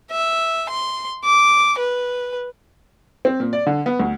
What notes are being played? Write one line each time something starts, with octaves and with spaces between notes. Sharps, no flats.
E5
C6
D6
B4
C4
A#2
D5
D3
B3
D2